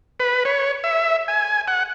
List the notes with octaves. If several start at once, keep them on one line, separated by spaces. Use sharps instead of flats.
B4
C#5
E5
G#5
F#5